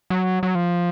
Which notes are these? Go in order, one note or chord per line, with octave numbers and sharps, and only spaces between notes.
F#3
F#3
F3